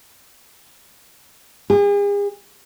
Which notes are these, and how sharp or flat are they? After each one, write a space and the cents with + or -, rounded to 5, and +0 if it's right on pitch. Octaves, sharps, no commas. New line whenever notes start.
G#4 -40